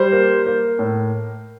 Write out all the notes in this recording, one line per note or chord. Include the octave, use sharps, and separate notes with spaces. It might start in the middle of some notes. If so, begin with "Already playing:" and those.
Already playing: G3 C5
A#3
A#3
A2